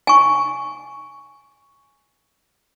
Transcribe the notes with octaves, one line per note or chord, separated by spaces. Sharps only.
G#5 C#6